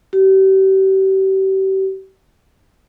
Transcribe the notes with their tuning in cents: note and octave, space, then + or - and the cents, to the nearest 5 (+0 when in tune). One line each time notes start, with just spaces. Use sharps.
G4 -35